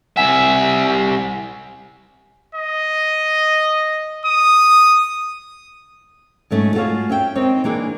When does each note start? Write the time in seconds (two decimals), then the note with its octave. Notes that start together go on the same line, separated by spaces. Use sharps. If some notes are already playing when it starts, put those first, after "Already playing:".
0.17 C2 E5 F#5 G#5 B6
2.55 D#5
4.25 D#6
6.51 G#2 F#3 A3 C#4
6.74 A3 F4 F#4 G#4 C#5 F5
7.09 C#4 E5 G5
7.35 C4 D#4 A#4 C#5
7.64 E3 A#3 D4 G#4